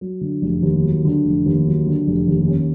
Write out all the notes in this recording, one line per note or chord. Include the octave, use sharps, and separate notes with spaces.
F#3
D3
F1
D#2
F#3
D3
F1
D#2
F#3
D3
F1
D#2
C#4